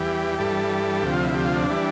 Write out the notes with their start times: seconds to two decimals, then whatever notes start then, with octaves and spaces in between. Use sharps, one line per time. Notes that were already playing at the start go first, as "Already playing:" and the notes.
Already playing: E2 E3 G3 G4
0.39 G2 E3 G3 A4
1.02 D2 C3 F3 G4
1.13 F4
1.24 E4
1.35 G4
1.46 F4
1.56 D4
1.69 E3 G3